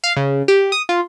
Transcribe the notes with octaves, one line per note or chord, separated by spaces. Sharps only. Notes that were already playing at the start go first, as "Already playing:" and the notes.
F5
C#3
G4
D#6
F4